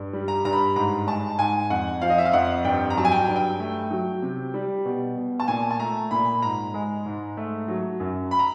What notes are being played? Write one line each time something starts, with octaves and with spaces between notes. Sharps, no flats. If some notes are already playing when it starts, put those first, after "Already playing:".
Already playing: G2
G3
A#5
G2 A#5
B5
G#2 A#5
G#3 A5
G#2 G#5
F2 F#5
F3 F5
D#5
E5
F5
F2 F#5
G2 G5
A#5
F#3 A5
G#5
G5
G2
G5
A3
F#3
C3
G3
B2
B2
A5
A#2 G#5
A5
A3 A#5
A#2 B5
G#2 A#5
G#3
G#2
A3
F#3
F#2
B5
A#5